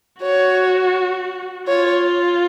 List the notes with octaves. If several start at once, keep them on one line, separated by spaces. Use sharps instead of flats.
F#4 C#5
F4 C#5